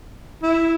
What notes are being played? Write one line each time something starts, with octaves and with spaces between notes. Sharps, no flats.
E4